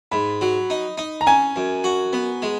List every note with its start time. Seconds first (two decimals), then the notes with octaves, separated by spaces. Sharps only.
0.11 G#2 B5
0.41 F#3
0.70 D#4
0.98 D#4
1.21 A#5
1.27 C#4 G#5
1.56 F#2
1.84 F#4
2.13 B3
2.42 G#3